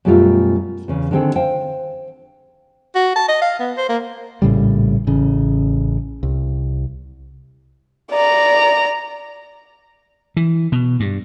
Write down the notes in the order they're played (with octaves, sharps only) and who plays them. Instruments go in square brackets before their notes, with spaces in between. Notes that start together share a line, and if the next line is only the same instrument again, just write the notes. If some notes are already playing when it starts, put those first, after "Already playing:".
[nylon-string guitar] F#2 B2 G3 A3 F4
E2 C#3
D3 D#3 C4 G#4 G5
C5 F5 G5
[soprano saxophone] F#4
A5
D#5
F5
B3
C5
A#3
[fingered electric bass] A#1 A2 C#3 G3
A1 C#3
C2
[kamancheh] D5 A#5
[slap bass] E3
B2
G2